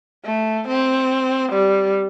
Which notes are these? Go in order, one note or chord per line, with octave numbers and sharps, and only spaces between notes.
A3
C4
G3